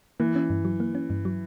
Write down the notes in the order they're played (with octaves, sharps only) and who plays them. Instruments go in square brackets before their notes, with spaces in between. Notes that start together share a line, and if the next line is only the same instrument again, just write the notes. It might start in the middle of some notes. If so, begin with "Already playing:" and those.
[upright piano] E3 [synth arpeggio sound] A#3
[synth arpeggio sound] C#4
G2
F#3
A#3
C#4
G2
F#3